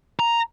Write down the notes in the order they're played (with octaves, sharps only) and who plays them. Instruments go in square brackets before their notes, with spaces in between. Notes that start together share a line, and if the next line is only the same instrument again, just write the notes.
[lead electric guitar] A#5